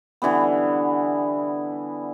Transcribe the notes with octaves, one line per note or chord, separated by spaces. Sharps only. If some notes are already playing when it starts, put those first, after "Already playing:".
D3 E3 G3 B3